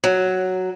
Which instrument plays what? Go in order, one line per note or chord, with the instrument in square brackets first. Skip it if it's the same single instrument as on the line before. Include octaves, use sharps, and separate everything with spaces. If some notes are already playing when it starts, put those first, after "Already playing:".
[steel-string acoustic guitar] F#3